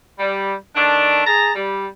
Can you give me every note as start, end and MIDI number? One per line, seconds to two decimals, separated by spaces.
0.19 0.54 55
0.76 1.22 51
0.76 1.22 57
0.76 1.22 62
1.26 1.50 68
1.26 1.50 81
1.26 1.50 82
1.56 1.86 55